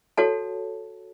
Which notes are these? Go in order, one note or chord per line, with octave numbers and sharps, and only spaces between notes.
F#4 A4 C#5 F#5 A5